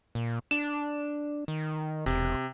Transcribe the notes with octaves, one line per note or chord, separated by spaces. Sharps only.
A#2
D4 E7
D#3
E1 C3